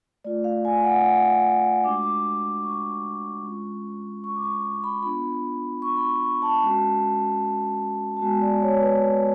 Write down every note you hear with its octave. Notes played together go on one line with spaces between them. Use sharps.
A3 F4 D5
F5
G#5
F#5
F#5
G#3 D4 F#4 D6
D6
C#6
G#3 C#4 F4
C#6
D6
C#6
B5
B3 D4 F4 B5
C#6
B5
C#6
C#6
A5
G#3 C#4 F#4
A5
G#3 B3 F#4 G#5
D5
C#5
B4